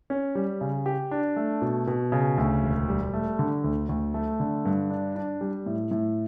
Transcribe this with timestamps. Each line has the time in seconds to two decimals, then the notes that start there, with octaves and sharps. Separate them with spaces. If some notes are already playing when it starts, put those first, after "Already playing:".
0.10 C#4
0.35 G3
0.61 C#3
0.86 G4
1.11 D4
1.36 A3
1.62 B2
1.87 B2
2.12 C#3
2.38 D2
2.63 E1
2.88 G3
3.14 A3
3.39 D3
3.64 D2
3.89 D2
4.14 A3
4.40 D3
4.65 G2
4.90 D4
5.16 D4
5.41 G3
5.66 A2
5.91 A2